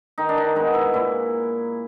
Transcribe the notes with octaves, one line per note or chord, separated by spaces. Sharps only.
D#3 D#4
D4
D#4
G#3 B3 D#4
E4
A#2 E4